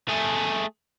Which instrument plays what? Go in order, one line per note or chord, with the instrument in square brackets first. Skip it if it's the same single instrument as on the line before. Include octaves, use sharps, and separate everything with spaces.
[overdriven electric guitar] A3 G#4